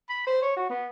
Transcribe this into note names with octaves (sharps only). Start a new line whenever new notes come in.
B5
C5
C#5
F#4
B3